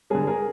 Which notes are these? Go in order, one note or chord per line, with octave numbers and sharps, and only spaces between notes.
D3 G3 G#4 A#4
G#4 A#4